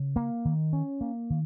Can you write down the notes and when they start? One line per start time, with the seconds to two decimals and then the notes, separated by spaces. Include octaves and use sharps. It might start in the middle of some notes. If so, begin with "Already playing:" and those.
Already playing: C#3
0.16 A#3
0.45 D#3
0.73 C#4
1.01 A#3
1.30 D#3